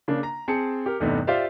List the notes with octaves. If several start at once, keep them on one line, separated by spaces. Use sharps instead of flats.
C#3 A#3 D4
A#5
C4 G#4 A5 C#7
G4 A#4
E2 G2 C3 A3 B3 D#4
F4 G4 C5 D5 E5 F5